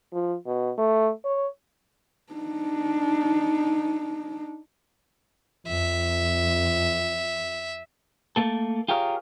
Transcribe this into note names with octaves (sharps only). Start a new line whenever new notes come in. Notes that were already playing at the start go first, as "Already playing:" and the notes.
F3
B2
A3
C#5
D4 D#4
F2 E5
A3 A#3 A4
F4 G4 G#4 A#4 C#5 F5